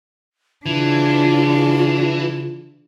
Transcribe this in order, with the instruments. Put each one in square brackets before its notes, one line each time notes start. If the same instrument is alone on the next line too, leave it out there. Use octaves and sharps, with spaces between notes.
[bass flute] C#3 [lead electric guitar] E3 [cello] D4 [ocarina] F4